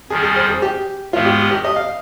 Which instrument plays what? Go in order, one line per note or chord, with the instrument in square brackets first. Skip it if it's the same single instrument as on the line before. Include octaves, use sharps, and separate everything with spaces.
[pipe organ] F2 D#3 G3 [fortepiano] G#4
[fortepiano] G#4
C5
G#4
G4
[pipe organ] G#2 D#3 G#3 B3 [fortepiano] F4
[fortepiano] G4
G4
D#5
F5